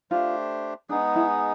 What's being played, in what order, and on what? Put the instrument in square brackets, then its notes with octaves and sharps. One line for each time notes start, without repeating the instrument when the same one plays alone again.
[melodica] A3 D4 G4 C5 [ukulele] F4
[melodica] G#3 B3 D#4 G#4 [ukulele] D4
[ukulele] E4